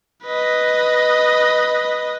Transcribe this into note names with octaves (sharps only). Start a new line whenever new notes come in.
B4 D#5